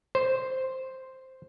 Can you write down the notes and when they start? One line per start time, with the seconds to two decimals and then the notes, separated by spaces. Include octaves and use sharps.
0.15 C5